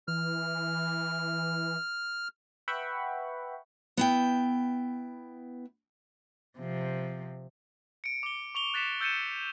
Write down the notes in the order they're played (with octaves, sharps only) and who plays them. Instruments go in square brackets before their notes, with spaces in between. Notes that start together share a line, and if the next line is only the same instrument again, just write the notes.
[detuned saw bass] E3 [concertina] F6
[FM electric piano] B4 E5 F#5 G5 B5 C#6
[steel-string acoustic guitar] B3 E4 G5
[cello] C3 F3
[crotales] C#7 D7
D6 G7
C#6 F7 G7
F#6 A6 B6 C#7 E7
E6 G6 A6 C#7 D#7 E7